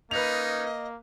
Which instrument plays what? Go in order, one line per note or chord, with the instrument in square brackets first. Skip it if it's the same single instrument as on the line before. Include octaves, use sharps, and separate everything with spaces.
[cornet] A#3 [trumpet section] C#4 D#4 [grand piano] B4 F7 [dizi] D#5